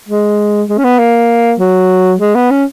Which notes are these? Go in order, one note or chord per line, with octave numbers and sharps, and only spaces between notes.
G#3
G#3
C#4
B3
A#3
F#3
G#3
B3
C#4